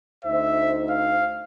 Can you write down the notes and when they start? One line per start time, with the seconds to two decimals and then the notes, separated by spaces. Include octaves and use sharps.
0.25 D2 D#4 C5 E5
0.90 F5